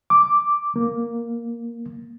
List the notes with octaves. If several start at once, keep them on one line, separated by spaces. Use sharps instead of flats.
D6
A#3